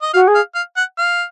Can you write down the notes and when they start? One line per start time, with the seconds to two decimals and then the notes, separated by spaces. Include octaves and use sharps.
0.02 D#5
0.14 F#4 F5
0.27 G#4
0.35 F5
0.55 F5
0.77 F#5
0.98 F5